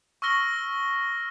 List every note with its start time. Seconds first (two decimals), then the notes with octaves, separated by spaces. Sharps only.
0.22 C#6 E6 F6 A#6 G7